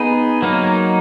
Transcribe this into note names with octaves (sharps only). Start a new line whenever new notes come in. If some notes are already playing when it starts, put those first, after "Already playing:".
Already playing: B3 D#4 G#4
F#3 A#3 D#4